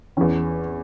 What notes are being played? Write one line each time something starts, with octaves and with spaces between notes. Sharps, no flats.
E2 E3 C#4